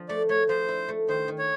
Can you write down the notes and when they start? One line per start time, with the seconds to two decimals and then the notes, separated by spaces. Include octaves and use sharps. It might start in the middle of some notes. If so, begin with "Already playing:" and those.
Already playing: F3
0.09 A3 D5
0.29 A3 C#5
0.49 F3 C5
0.68 E4
0.88 A3
1.08 D#3 C5
1.28 D#3
1.38 C#5